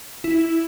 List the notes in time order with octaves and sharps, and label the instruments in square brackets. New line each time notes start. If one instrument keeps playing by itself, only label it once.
[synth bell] E4